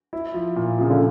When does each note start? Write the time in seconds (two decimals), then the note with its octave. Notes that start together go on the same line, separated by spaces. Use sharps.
0.13 E4
0.34 F3
0.56 A#2
0.78 C#3 F3
0.90 D3